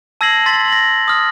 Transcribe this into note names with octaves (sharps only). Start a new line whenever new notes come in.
A5 E6 G#6 A#6 C7 F#7
C6 A6 B6
A#6 F#7
D#6 F6 A#6